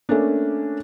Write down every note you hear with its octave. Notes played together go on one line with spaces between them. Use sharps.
A3 A#3 C#4 D4